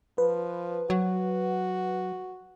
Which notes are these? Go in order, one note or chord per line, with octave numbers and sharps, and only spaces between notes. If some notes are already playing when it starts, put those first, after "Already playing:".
F3 B4
F#3 F#4